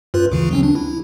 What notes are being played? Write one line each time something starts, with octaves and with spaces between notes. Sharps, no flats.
F#2 F4 B4
D2 C#3 E3
F#3 C4 C#4
D4
E4